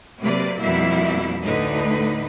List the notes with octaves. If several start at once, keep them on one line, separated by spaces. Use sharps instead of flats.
C3 F#3 A#3 B4 D5
F2 B2 G3 A#3 E4 E5
D2 A2 D3 D#4 B4